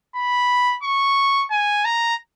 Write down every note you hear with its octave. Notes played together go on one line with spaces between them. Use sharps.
B5
C#6
G#5
A#5